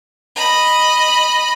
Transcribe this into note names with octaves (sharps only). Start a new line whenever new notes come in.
D#5 B5